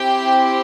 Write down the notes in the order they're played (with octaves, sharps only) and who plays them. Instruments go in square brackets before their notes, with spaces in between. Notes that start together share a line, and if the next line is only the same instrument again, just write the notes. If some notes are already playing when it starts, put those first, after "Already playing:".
Already playing: [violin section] C4 E4 G4 G5